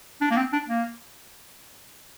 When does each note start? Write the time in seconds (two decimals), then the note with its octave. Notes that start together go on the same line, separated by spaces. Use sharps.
0.21 D4
0.31 A#3
0.37 C4
0.53 D4
0.68 A#3